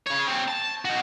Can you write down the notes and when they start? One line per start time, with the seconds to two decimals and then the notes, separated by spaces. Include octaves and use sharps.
0.07 C#3 C#5
0.27 C4 C#5
0.48 A5
0.85 D#4 F#4